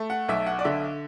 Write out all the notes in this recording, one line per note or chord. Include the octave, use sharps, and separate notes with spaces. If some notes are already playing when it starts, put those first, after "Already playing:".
Already playing: A3
F#5
B1 E5
F#5
D5
D3 E5